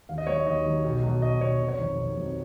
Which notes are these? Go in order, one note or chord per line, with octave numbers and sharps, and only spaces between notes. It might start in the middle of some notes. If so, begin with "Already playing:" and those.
D#2 F5
D#5
D#3 F#3 C#5
D#5
D#2 D#5
D#3 F#3
B1
B2 F#3
B1 D#5
B2 F#3 C#5
F1
C#5
F2 D#3 F#3
F1
F2 D#3 F#3